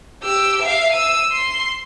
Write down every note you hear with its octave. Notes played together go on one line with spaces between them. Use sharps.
G4 E6
E5 F5
E6 D#7
C6